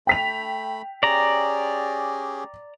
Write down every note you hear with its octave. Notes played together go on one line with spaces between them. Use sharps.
A3 G5 B5 B6 F7
C#4 G4 G#4 D5 A#5